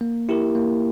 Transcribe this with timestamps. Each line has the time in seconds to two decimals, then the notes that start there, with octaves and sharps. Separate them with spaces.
0.01 A#3
0.29 E4 G4 A#4
0.55 A#3